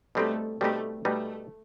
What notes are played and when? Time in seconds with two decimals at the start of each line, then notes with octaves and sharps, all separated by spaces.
0.15 B2 G3 A3 C4 D#4 G4
0.61 B2 G3 A3 C4 D#4 G4
1.05 B2 G3 A3 B3 D#4